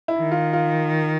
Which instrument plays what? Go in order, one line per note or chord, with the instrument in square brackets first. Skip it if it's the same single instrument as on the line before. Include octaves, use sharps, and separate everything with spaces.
[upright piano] E4
[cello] D#3
[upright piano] F4
F4